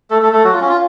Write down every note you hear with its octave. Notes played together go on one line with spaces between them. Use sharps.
A3 A4
A3 A4
A3 A4
F#3 F#4
F4
C#4
F4